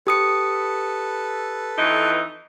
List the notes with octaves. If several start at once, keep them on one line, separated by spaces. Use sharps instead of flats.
G4 A4 B4 D#6 C#7
F2 E3 D#4